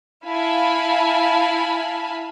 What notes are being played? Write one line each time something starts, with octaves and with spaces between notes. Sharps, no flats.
E4 F5 G#5 A5 B5